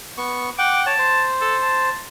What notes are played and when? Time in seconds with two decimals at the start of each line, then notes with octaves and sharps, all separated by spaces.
0.17 B3 C#6
0.58 F#5 G5 D6
0.86 C#5 A5
0.99 C5
1.41 A4
1.62 A5